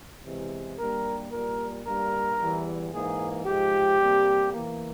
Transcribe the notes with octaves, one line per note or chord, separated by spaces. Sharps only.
E2 C3 E3 G#3
G2 G3 A#3 A#4
A#2 G3 A#3 A#4
G2 G3 A#3 A#4
E2 E3 G3
G#2 E3 A#3 G#4
G#2 F3 G#3 G4
C3 G3 A#3
E2 E3 A#3